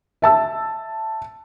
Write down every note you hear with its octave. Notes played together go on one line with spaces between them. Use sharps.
E5 A5 E6